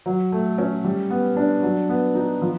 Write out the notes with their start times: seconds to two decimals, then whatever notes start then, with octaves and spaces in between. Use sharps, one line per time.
0.06 F#3
0.32 A3
0.58 C#4
0.84 G3
1.10 B3
1.36 D4
1.63 F#3
1.89 B3
2.15 D#4
2.42 F3